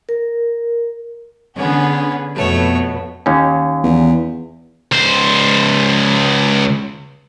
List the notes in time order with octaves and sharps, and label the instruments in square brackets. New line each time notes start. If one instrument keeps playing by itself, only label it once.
[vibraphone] A#4
[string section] D3 G#4 [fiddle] B3 C#4
[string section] F2 B2 B3 [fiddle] A3 C#5
[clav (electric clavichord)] D#2 C#4
[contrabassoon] E2
[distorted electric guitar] C#2 C5